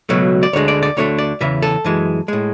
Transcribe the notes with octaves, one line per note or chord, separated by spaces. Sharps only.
C#2 B2 F#3 A3
D5
D2 D3 G#3 C#5
D5
D5
D2 D3 A3 C#5
D5
E2 C#3 E3 E5
A4
F#2 E3 G#3
A2 G#3